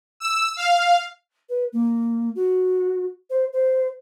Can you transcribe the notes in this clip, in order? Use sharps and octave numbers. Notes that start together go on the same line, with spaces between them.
E6
F5
B4
A#3
F#4
C5
C5